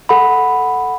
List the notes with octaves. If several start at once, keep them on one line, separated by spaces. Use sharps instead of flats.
A4 F#5 B5